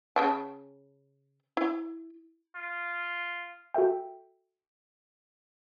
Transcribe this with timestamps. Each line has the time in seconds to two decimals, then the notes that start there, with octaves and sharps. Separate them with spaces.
0.16 C#3 G5 A5
1.57 E4
2.55 F4
3.74 F#4 A4 E5 G5